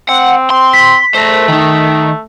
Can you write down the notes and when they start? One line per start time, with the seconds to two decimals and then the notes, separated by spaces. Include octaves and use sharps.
0.09 C4 F#5
0.50 C4 C6
0.73 B6
1.15 A3 A#4 C5
1.49 D#3 D#4